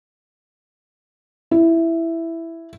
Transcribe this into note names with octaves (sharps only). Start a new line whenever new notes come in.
E4